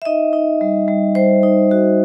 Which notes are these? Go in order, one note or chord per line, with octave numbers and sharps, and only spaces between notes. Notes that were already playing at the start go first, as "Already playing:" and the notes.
E5
D#4 D#5
D#4
G3
G3
G3 C5
D#4
F#4